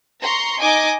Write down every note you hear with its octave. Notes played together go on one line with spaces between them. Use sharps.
A#5 C6 C#6
D#4 D#5 G#5 D6